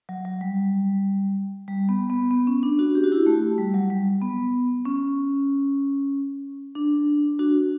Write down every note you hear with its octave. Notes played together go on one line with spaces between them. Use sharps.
F#3
F#3
G3
G3
B3
B3
B3
C#4
D4
D4 F#4
G4
F#4
E4 G4
A3
G3
F#3
G3
B3
C#4
D4
D4 F#4